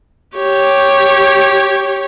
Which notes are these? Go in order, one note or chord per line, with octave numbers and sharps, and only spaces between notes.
G4 C#5